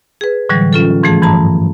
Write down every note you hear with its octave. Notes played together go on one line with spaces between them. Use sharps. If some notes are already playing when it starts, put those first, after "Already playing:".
G#4 B4
A2 D3 E3 F#3 G3
C#4 F4 A4
G#2 E3 F3 A3 G#4 A5
G2 E3 A5 A#5